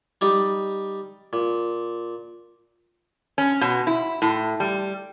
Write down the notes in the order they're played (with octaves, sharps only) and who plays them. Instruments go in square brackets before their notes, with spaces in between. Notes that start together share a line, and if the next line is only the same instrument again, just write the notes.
[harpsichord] G3 D#4 G4
A#2
[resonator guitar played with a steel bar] C#4
B2
E4
A2
G3